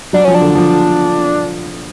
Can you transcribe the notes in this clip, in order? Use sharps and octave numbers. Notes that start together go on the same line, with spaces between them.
F#3 D4
F3 C#4
D4
D3
F3